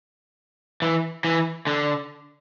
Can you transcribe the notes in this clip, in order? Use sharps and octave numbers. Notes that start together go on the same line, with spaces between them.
E3
E3
D3